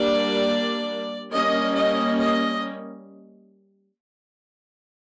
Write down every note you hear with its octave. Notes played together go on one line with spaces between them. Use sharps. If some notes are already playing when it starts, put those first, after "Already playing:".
Already playing: G3 A#3 D4 D5
G3 A#3 C#4 D#5
D#5
D#5